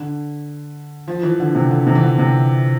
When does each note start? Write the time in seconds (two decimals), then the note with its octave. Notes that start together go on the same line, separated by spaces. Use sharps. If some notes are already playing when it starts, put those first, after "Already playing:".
Already playing: D3
1.08 F3
1.23 E3
1.40 D3
1.55 C3
1.71 D3
1.87 C3
1.95 E3
2.02 D3
2.19 C3